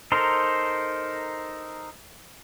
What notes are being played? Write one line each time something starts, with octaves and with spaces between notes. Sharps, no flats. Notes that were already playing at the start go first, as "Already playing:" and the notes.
D#4 A4 A#4 C5